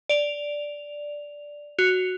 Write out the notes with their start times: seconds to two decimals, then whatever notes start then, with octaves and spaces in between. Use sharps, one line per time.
0.09 D5 F7
1.78 F#4 F7